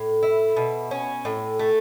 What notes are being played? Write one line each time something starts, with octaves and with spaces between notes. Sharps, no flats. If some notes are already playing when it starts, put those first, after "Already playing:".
Already playing: A2
E4
B2
C#4
A2
A3